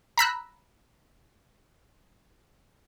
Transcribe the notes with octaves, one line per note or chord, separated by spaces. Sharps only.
A#5 B5 E6 F#6